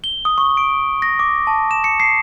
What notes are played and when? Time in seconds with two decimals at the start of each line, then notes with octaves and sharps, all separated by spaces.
0.04 G7
0.25 D#6
0.38 C#6
0.57 D7
1.02 A#6
1.19 D6
1.47 A5
1.71 E7
1.84 C#7
2.00 C7